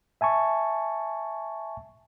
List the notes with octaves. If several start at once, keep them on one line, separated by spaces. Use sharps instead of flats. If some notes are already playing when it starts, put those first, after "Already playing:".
E5 G#5 A5 C#6